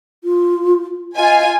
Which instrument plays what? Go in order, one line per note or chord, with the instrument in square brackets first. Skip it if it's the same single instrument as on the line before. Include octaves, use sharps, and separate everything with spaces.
[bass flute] F4
[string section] F4 G#5 [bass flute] D#5